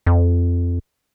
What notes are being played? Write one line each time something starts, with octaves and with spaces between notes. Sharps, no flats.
F2